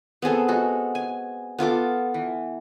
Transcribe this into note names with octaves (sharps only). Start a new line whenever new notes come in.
B3 C4 G#4 A4
G#3 F#4 A4
G#5
B3 F4 A4 D6
E3